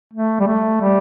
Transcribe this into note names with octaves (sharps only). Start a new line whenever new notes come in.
A3
G3
A3
G3